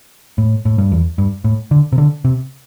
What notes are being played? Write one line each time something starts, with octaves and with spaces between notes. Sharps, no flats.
A2
A2
G2
E2
G2
A2
D3
C3
D3
C3